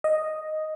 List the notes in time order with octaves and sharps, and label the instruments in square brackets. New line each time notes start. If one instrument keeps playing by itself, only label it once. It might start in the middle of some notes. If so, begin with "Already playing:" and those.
[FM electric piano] D#5